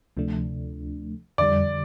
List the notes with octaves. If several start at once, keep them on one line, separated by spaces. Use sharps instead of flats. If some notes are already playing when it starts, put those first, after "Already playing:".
D2 C3 F3 A3 D4
F2 D3 G3 D5